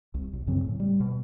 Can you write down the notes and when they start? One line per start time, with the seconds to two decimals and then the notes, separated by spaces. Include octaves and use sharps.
0.14 C2
0.33 B1
0.47 F#2 C#3 F#3 C4
0.64 A2
0.80 G3
1.00 B2